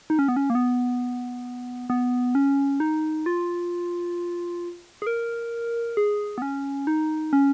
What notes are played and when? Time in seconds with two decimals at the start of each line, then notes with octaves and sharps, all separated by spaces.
0.10 D#4
0.19 C#4
0.28 B3
0.36 C#4
0.50 A#3
0.55 B3
1.90 B3
2.35 C#4
2.80 D#4
3.26 F4
5.02 G#4
5.07 A#4
5.97 G#4
6.38 B3
6.42 C#4
6.87 D#4
7.33 C#4